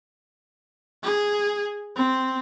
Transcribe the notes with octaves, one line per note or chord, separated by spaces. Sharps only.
G#4
C4